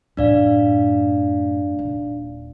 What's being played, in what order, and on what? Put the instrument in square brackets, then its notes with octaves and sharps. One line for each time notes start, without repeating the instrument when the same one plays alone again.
[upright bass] F#2 A2 [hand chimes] D4 D5 F5
[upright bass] D#1